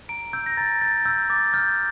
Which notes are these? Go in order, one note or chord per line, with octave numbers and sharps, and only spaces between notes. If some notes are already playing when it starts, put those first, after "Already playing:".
A#5 D7
E6 G6
A#6
A#5 A6
G6 A6
E6 G6
D6 A6
F6 G6